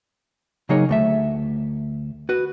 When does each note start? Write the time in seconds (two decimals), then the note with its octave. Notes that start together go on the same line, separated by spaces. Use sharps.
0.69 C#3 F#3 A#3 D#4 G#4 C#5
0.89 D2 A3 E5
2.29 F#4 B4